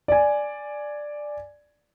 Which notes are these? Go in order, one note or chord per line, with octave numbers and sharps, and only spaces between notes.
D5 G#5